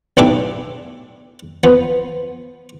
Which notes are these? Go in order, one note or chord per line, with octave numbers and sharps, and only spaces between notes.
B1 A2 D4 G4 A4 E5
F3 B3